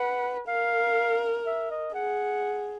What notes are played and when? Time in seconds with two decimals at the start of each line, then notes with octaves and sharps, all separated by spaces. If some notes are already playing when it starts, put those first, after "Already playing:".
Already playing: B4 F#5
0.47 A#4 F5
1.46 E5
1.70 D#5
1.94 G#4 F#5